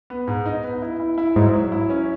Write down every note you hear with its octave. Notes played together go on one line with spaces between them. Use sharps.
B3
G#2
D#4
B3
E4
E4
E4
G#2 F#3
F#3
E4
C#4